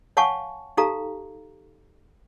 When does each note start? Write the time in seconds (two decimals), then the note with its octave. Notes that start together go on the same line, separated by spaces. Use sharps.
0.17 C#5 F5 F#5 G#5 A5 C#6
0.77 D#4 G4 A4 F5 A#5